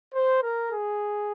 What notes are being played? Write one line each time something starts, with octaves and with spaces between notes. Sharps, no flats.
C5
A#4
G#4